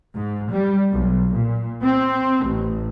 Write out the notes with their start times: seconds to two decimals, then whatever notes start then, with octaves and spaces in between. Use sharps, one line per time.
0.15 G#2
0.51 G3
0.91 B1
1.34 A#2
1.81 C4
2.46 A1